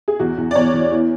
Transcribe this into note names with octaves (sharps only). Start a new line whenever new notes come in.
G#4
E2 F#4
E2
D5
E2 C#5
E2
E3